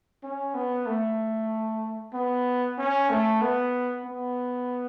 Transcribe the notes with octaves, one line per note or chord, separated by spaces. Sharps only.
C#4
B3
A3
B3
C#4
A3
B3
B3